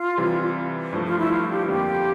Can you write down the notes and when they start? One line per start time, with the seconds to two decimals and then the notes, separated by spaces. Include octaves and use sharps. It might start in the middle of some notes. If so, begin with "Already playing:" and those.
Already playing: F4
0.17 C3 E3 G3
0.93 G2 F3 A3
1.05 F4
1.18 E4
1.31 F4
1.50 G4
1.68 F2 D3 G3 A#3 F4 G4